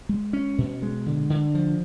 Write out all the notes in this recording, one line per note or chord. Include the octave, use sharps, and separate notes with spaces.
G#3
C#4
B2
G#3
D3
D3
F3